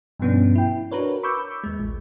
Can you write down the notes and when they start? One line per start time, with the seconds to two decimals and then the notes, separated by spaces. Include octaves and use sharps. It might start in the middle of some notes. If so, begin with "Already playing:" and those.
0.19 G2 B2 F3 B3 C#4 D4
0.56 E4 G5
0.91 D4 F#4 A#4 B4 C#5
1.23 B5 C#6 D6 E6 G6
1.64 D#2 G#3
1.80 A1